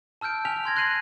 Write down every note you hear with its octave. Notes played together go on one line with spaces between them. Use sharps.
A5 E6 F6 G6 D7
G#5 F6 B6 F7
G#5 C6 G#6 A#6
C6 F#6 A#6 C7 D#7 F#7